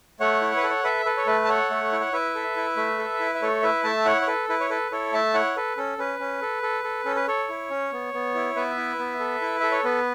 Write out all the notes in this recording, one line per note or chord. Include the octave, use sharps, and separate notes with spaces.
A3 C#5 F#5
E4
B4
A4
C#5
A4 B4 E5
A4 B4
C#5
A3 B4
A5
A4 C#5 F#5
A3
E4
F#5
E4 B4 E5
A4
E4
A3
A4
E4
E5
A3 A4 C#5
E4 B4 E5
A3 E5 A5
E4 C#5 F#5
C#5
A4 B4
E4 B4
C#5
A4 B4
E4 A4 C#5
A3 E5 A5
E4 C#5 F#5
A4 B4
C#4 A4
C#4 B4
C#4
A4
A4
A4
C#4 A4
B4
A4 C#5
E4
C#4
B3
B3
E4
B3 B4 E5
E4
B3
A4
E4
A4 E5
C#5
B3 B4